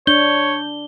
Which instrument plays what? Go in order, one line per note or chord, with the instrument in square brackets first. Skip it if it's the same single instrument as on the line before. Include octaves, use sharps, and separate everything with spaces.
[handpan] D4 [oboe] C#5 [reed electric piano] G6 [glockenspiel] G7